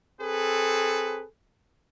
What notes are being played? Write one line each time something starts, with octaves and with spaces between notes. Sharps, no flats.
C4 G#4 A4 B4